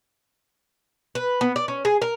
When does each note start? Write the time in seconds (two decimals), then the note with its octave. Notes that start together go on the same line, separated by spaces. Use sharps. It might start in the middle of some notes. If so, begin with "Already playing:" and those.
1.15 B4
1.41 B3
1.56 D5
1.68 C#4
1.85 G#4
2.02 A#4